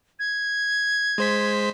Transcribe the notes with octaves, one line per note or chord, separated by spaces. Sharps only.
G#6
G#3 C5 B6